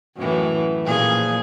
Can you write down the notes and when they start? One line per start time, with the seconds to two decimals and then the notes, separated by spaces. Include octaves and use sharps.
0.16 F#2 A2 E3
0.84 A#2 F3 G#4